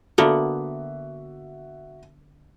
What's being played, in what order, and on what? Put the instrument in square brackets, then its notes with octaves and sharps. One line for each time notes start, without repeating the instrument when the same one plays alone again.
[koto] D3 A#3 B3 [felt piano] F#4 E5